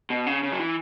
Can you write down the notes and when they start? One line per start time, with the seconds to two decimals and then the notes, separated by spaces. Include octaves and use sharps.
0.10 B2
0.27 C#3
0.43 C#3
0.52 F#3
0.59 E3